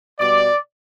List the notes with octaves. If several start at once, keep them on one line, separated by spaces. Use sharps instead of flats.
B2 G3 D5